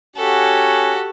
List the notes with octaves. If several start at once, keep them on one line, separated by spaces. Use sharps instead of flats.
C#4 F#4 G4 A4 F#5